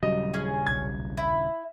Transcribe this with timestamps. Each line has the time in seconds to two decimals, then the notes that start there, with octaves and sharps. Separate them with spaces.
0.03 D#1 C#3 F#3 G3 D#5
0.34 C#4 G#4
0.67 B1 G#6
1.17 E4